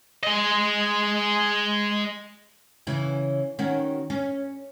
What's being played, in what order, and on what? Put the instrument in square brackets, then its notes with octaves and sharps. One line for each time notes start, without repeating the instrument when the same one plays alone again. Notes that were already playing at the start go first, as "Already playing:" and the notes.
[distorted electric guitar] G#3 D#5
[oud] C#3 E3 C#4
D#3 C#4 F#4
C#4